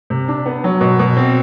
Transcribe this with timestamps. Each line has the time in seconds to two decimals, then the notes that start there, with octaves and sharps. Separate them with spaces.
0.10 C3
0.28 D4
0.46 B3
0.64 F#3
0.81 B2
0.99 B2
1.17 C4